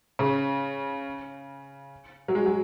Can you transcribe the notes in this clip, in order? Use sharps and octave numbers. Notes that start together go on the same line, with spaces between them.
C#3
F#3
G#3
F#3